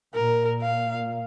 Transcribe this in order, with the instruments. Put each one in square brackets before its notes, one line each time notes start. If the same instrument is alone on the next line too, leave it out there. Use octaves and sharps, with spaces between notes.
[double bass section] A#2 [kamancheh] A#4
[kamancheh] F5